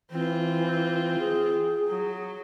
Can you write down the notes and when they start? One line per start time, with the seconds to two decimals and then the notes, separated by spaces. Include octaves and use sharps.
0.11 E3 C4 F4
1.19 G#4
1.88 F#3